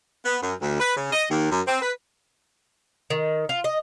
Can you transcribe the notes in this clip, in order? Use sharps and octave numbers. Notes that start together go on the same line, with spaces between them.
B3
F#2
D2
B4
C#3
D#5
D#2
F#2
C4
B4
D#3
F4
D#5